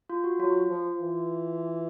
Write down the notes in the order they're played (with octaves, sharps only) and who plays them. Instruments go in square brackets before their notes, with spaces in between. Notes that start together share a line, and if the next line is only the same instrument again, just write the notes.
[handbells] F4
F#4
[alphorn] F#3 [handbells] F4
[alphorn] F3
E3